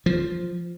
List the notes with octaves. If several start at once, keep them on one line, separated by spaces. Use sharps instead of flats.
F3